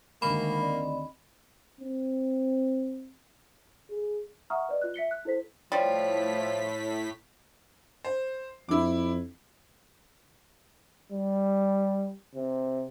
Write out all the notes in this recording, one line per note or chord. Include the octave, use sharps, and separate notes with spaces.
D2 D#3 G#3 A#3 D#5 B5
C4 D5 D#5
C4
G#4
E5 F#5 A#5 C#6 D#6 F6
B4 D5 D#5
F4 F#6
E5 B6 C#7 G7
F#6
E4 A4 C5 B6
A2 F3 G3 C#5 B6
C5
F2 E4 D6
G3
C3